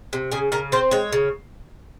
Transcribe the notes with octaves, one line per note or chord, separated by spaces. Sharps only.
C3
C#3 G#4
C#3 A#4
C4 C5
G#3 C#5
C#3